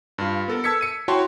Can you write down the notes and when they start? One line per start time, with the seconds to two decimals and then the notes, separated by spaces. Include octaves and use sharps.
0.18 G2 F4
0.48 B3 A4 A#4
0.64 A5 E6 G#6 B6 C#7
0.81 E6 C#7 D#7
1.08 E4 F#4 C#5 G5 A5 C6